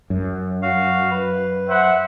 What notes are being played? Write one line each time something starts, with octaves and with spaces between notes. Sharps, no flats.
F#2
F#4 F5
B4
C5 E5 F#5